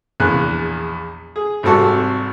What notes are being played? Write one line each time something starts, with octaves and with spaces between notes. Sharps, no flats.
A#1 E2 F#6
G#4
G#1 C3 G3 F#4 A4 C#6